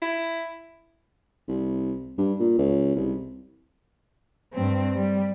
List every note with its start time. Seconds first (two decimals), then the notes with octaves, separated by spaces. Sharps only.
0.02 E4
1.48 C2
2.18 G2
2.39 A#2
2.58 C#2
2.95 C2
4.53 G2 C4
4.95 G3